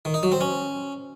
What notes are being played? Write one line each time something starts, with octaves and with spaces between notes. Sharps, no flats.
D#3
D#4
F#3
C4
C#4